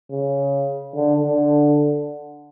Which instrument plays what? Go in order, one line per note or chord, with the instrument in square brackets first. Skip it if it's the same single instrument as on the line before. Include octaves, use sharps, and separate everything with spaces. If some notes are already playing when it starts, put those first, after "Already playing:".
[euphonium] C#3
D3
D3